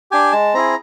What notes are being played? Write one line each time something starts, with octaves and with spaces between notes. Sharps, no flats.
D4 G4 G#5
G#3 A5
C4 E4 G#4 A#5